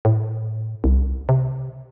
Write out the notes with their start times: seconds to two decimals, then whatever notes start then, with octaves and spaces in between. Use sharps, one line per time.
0.05 A2
0.84 C2
1.29 C3